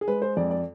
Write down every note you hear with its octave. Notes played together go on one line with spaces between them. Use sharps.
G#4
G#3 B4
C5
F2 D5
D5